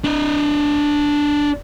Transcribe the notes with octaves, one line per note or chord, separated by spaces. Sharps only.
D4 D#5